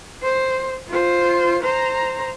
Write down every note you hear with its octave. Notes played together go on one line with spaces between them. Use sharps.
C5
F4 C5
C5 A#5